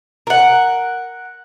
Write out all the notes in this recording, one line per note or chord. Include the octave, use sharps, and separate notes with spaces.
A#4 F#5